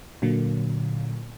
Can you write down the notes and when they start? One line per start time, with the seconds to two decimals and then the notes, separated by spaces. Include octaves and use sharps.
0.22 A#2 D3 F#3 A#3